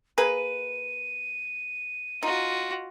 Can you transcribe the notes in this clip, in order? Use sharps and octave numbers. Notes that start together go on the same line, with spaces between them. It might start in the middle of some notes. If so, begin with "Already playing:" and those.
A#3 G#4 B4 D#7
D#4 F4 F#4